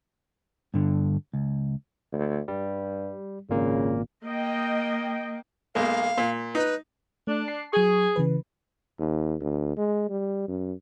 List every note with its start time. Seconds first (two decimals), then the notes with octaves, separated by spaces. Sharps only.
0.74 G2 D3
1.34 C#2
2.12 D2
2.48 G2 G3
3.50 G#1 A#2 C#3 A#3
4.26 A#3 D#5 G5
5.75 B1 G#3 A#3 F5
6.18 A#2
6.55 D#4 B4
7.27 A3 D4
7.48 A5 C7
7.72 F#3 G#4 C#6
8.16 C#3 E3 B4
8.99 D#2
9.41 D2
9.78 G#3
10.10 G3
10.48 F#2